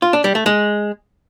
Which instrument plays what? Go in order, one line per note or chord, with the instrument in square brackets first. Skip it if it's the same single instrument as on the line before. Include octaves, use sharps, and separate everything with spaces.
[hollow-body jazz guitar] F4
D4
G3
A3
G#3